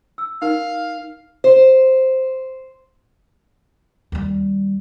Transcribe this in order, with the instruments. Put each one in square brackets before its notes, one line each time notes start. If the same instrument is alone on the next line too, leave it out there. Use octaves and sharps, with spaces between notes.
[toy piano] E6
[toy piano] D#4 A#4 [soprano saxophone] F5
[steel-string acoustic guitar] C5
[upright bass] D#2 G3